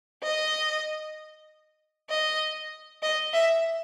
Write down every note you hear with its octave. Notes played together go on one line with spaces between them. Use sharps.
D#5
D#5
D#5
E5